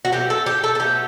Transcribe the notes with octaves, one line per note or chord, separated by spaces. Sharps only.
F#4
B2 F#3 A3 G4
A4
G4
A4
A4
B2 F#3 A3 G4